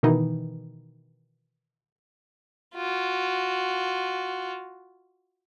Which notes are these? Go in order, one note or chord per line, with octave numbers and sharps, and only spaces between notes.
B2 D#3 E3 D#4
F4 F#4